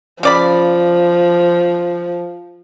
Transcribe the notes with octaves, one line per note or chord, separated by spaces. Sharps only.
C#3 F3 D5 B5